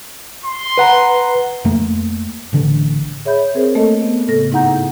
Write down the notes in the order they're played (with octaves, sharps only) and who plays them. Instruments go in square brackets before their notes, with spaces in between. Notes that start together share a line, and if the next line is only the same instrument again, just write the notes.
[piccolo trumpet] C6
[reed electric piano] B4 F#5 A#5
[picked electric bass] F2 A3 A#3
A1 D3
[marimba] G#4 C#5 E5 B5 G6
C4 G#4 A#4 C5
A3 A#3 A4 D#5
B3
A2 C#3 A4 A#6
G#2 D#4 E4 F#5 A#5 G6